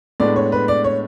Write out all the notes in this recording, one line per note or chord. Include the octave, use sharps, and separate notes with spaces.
A2 G#3 B3 D4 D5
C#5
B4
D5
C#5